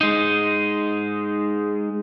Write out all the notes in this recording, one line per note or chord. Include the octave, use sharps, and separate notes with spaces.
G#3 D#4